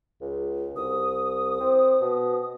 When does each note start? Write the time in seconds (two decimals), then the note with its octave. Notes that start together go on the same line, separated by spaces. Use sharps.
0.21 C#2
0.76 C2 D#6
1.60 C4
2.01 B2